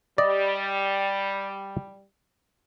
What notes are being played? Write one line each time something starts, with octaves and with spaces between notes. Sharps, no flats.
G3 D5 D#5